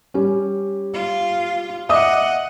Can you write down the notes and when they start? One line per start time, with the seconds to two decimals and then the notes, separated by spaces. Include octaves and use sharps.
0.14 G3 C#4
0.94 F4
1.89 D#5 E5 F#5 D6 D#6